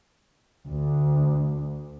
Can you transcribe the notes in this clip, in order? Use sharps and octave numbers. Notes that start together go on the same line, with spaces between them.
D2 D3